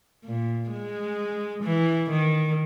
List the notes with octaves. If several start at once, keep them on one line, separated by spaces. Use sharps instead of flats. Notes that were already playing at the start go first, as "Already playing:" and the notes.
A#2
G#3
E3
D#3